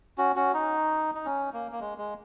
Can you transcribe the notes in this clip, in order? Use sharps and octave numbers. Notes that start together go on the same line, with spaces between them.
C#4 F#4
C#4 F#4
D#4
D#4
C#4
A#3
A#3
G#3
G#3